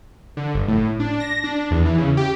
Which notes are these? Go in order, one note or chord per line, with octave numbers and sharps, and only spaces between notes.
D3
G1
A2
D4
A#6
D4
E2
E3
C#3
G4